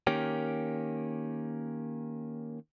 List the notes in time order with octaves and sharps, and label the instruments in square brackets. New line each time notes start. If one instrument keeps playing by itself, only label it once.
[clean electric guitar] D#3 A#3 C#4 G4